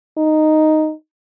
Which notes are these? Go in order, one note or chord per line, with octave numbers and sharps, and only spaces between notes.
D#4